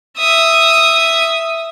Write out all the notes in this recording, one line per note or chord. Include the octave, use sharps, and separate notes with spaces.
E5 D#6